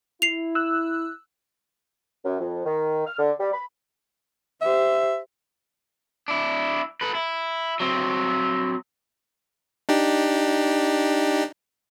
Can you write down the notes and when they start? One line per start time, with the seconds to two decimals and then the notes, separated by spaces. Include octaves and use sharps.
0.22 E4 C7 F7
0.55 E6 F#6
2.24 F#2
2.39 F2
2.66 D#3
3.06 F6
3.18 D3
3.40 G3
3.52 B5
4.61 G4 C5 E5
6.28 D4 E4
7.01 A4 B4
7.15 E4
7.80 F#3 C4
9.89 D4 D#4 G4